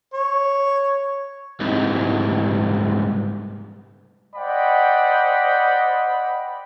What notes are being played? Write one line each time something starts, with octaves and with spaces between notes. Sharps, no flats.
C#5
C2 G#2
C5 D5 D#5 F#5 G5 B5